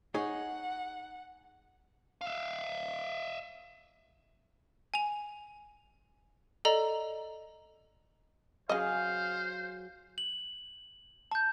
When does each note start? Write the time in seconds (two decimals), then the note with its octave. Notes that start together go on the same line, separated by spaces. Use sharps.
0.14 D#4 G#4 C#5 F#5
2.21 E5 F5
4.94 G#5 F7
6.65 A4 D5 D#5 A#5
8.69 C#3 F#3 G#4 C5 D#5 F5
10.18 F#7
11.31 A5 G6